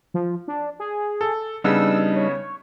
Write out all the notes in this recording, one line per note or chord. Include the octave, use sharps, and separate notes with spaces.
F3
D4
G#4
A4
C#3 G3 B3 D4 D#4 E6
C#5